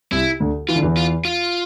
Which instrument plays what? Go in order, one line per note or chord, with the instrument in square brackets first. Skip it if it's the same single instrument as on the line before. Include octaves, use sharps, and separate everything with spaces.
[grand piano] C2 C3 [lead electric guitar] E4
[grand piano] D2 D3
[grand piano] E3 [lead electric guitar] F4
[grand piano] D3
E2 E3
[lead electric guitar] F4
F4